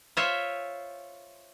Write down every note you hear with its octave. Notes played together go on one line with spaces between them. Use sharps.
F4 C5 C#5 E5